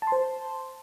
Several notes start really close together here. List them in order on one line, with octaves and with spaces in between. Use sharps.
A5 C6 C5